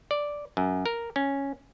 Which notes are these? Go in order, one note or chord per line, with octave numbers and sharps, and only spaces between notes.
D5
F#2
A#4
C#4